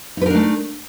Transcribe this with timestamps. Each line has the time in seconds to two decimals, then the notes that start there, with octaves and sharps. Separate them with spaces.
0.17 D#4
0.21 B4
0.26 A#4
0.30 D4
0.35 A3